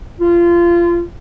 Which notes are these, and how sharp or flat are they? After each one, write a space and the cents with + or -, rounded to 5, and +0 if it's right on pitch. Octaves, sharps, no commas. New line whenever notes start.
F4 -25